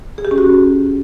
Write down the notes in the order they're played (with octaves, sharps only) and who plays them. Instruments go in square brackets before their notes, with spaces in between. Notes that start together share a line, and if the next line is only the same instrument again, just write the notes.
[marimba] G#4
G4
C#4
F#4